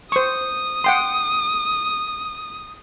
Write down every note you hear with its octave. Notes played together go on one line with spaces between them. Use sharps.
C5 C#6 D#6
F#5 G5 C6